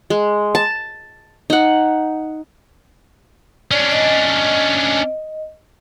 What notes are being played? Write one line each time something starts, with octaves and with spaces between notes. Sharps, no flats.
G#3
A5
D#4 F#5
C#4 D4 D5
D#5